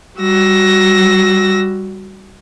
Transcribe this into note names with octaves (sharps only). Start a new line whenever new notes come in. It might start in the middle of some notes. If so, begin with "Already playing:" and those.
G3 F#4 E6 A#6